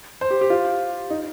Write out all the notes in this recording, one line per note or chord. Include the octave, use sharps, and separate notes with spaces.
C5
G4
G4
F4
D#4